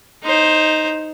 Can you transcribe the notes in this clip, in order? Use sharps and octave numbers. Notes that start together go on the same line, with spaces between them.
D#4 C5